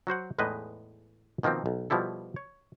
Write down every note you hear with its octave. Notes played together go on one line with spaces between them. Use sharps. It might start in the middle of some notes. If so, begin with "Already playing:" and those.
F#3 F#4 C5 F#5
E2 A2 G#3 D#4 B4 D#5
B2 D#3 F3 A#3 C4
B1
B2 F3 G3 E4 A4
C#5